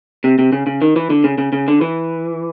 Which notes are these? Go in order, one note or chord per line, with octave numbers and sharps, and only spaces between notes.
C3
C3
C#3
C#3
D#3
E3
D3
C#3
C#3
C#3
D3
E3